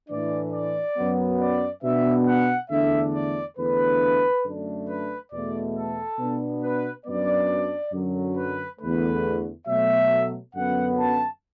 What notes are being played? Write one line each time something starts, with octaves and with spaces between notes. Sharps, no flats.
A2 E3 D4 D5
D5
F#2 F#3 B3
D5
B2 B3 D4 E5
F#5
E2 D3 A3 D4 E5
D5
E2 D3 A3 D4 B4
F#2 D3 A3 D4
B4
E2 B2 A3 D5
A4
B2 B3 D4
B4
F#2 F#3 B3 D4 D5
F#2 D3 F#3
B4
E2 D3 A3 B4
B2 F#3 A3 E5
F#2 D3 B3 F#5
A5